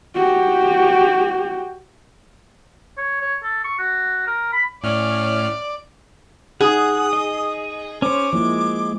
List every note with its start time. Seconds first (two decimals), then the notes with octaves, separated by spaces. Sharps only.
0.15 F#4 G4
2.97 C#5
3.21 C#5
3.43 A4
3.64 C#6
3.79 F#4
4.27 A#4
4.53 B5
4.84 A2 C#4 D5 F6
6.61 D#4 G#4 F#5 D#6
7.13 D#5
8.02 C#4 C5 C#5 D6
8.33 F3 G#3 A#3 E4